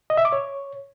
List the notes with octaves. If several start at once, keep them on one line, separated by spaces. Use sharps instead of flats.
D#5
E5
D6
C#5